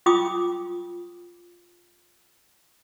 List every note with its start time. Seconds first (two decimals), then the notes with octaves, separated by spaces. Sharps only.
0.06 F4 G5 D6 D#6